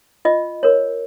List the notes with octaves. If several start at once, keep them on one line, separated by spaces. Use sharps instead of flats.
F4 D#5
A#4 C#5